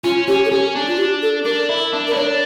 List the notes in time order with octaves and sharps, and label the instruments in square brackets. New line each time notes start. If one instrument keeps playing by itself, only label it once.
[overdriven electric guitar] C#4 [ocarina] F4
[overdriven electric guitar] C#4 [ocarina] G4
[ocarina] A4
[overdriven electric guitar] C#4 [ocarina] G4
[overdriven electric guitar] D4
[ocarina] F4
G4
A4
[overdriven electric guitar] D4 [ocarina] A#4
[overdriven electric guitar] E4
D4
[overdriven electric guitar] E4 [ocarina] A#4
[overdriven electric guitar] D4 [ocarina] C#5